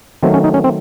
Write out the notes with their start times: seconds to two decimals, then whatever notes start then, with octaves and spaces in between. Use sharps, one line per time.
0.23 D#3 F#3 A3 C4
0.34 C#4
0.44 D#4
0.54 C#4
0.64 C4